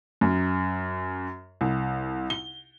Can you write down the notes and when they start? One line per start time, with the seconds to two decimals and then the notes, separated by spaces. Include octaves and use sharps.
0.21 F#2
1.61 C2
2.30 G7